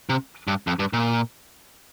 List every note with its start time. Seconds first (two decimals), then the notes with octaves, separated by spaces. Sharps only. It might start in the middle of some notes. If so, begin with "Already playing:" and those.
0.09 C3
0.47 G2
0.67 F2
0.79 G2
0.93 A#2